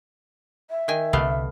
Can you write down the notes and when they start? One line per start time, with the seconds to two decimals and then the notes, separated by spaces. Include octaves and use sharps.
0.71 E5
0.88 D#3 G5 G#5
1.13 C2 D3 A3 B3 F5